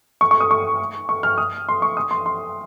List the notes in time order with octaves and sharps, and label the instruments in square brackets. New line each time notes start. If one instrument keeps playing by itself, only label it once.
[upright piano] C#6
C#6
D#6
C#6
C#6
F6
D#6
C6
C#6
D#6
C6
C6